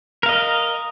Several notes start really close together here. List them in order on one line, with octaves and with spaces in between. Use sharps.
A#4 F5 D#5